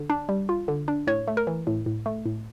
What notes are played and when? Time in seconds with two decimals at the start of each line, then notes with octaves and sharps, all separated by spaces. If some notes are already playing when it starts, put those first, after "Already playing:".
Already playing: D3
0.10 D4
0.29 G3
0.49 F4
0.68 D3
0.88 D4
1.07 A2 C#5
1.27 A3
1.37 A#4
1.47 E3
1.67 A2
1.86 A2
2.06 A3
2.26 A2